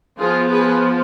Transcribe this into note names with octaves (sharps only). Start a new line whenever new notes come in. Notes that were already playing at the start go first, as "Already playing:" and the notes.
F3 B3 F4 G#4
G#4 B4